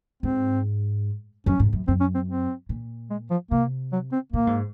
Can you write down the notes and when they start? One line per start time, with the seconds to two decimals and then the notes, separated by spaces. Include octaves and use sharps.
0.23 G#2 C4
1.46 F#2 C#4
1.59 G#2
1.73 F#2
1.88 F#2 C4
2.01 C#4
2.15 C4
2.28 C4
2.69 A#2
3.10 G#3
3.31 F3
3.51 C3 A#3
3.92 F#3
4.12 C4
4.33 A#2 A#3
4.47 G#2